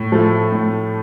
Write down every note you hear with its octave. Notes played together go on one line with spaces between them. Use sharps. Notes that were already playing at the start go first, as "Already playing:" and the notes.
Already playing: A2
F3 A3
A2